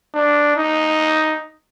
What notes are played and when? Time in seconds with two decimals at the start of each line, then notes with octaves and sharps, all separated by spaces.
0.14 D4
0.56 D#4